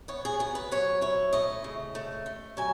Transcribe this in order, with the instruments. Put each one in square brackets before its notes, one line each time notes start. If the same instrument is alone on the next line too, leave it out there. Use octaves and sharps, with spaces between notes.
[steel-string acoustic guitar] B3 C#5
G#4
F#3 G#4
B4
F#3 C#5
E4 C#5
A3 D#5
C#3
A3
A3
F#3 G#5